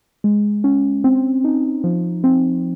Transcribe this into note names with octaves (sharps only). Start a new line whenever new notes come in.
G#3
C#4
C4
D#4
F3
C4